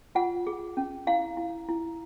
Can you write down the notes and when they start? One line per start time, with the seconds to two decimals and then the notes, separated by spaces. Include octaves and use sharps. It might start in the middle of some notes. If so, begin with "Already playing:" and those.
0.15 F4 F#5
0.47 G#4
0.77 C#4
1.07 E4 F5
1.37 E4
1.69 E4